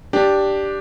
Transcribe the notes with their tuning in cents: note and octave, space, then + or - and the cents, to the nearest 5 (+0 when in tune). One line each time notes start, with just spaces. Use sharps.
D4 +0 G4 +0